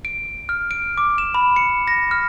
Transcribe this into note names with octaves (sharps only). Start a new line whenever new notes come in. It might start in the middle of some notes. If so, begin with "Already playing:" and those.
D7
F6
D7
D6
E7
B5
C#7
A#6
F6